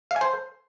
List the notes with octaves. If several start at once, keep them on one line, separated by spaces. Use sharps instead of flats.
F5
G#5
C5